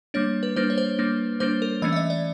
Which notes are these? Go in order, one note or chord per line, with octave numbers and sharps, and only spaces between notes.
G3 A#3 D4 C#5
B4
G3 A#3 D4 C5
C#5
C5
G3 A#3 D4
G3 A#3 D4 C5
A#4
E3 A3 C#4 D#5
E5
D#5
D5